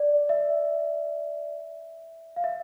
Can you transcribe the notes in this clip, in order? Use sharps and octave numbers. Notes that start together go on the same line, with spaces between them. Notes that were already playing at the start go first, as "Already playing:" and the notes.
Already playing: D5
E5
F5
E5